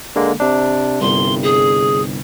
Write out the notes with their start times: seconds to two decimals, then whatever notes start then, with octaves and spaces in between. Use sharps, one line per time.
0.16 D3 G#3 A#3
0.40 C3 D4
1.01 G1 C2 G2 C6
1.43 G#4